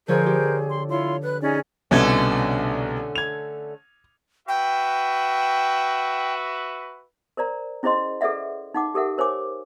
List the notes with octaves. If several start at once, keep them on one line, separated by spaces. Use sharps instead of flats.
D3 F3 G#4 A#4 C5 C#5 G6
G4
C6
E4 F4 C#5 C6
B4 F#6
C#4 D#4 G#4 D5
C2 B2 D3 A3 C#4 G#6
G#6 F7
F#4 B4 E5 G5
A#4 C5 D5 A#5
C#4 E4 G#4 C5 D#5 C6
G#4 A4 B4 D5 E5 F#5
D#4 F#5 D6
G4 A4 A#4 E5 F#5
A#4 C5 C#5 G#5 D6